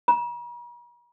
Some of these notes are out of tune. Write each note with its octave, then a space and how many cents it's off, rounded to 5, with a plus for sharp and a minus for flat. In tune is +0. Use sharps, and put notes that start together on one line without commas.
A#5 +45